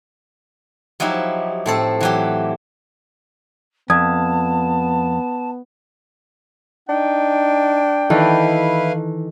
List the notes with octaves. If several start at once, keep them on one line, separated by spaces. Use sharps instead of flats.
F3 F#3 D#4 E4 G4
A2 C4 A4
E3 F#3 G4
F2 B3 A5 D#6 G#6
D4 D#4 G5
D#3 E3 E4 A4 B4 F5